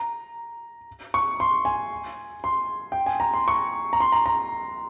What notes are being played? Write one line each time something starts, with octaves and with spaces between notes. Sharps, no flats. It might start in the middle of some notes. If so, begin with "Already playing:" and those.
Already playing: A#5
C#6
C6
G#5
C6
G5
G#5
A#5
C6
C#6
A#5
C6
A#5
A#5